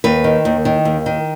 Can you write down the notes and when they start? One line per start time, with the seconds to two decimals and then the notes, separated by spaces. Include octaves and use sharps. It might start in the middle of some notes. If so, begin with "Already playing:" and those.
0.04 D#2 B4
0.24 D#3
0.45 D#2
0.65 D#3
0.85 D#2
1.06 D#3